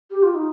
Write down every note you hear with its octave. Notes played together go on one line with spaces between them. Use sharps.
G4
F4
D#4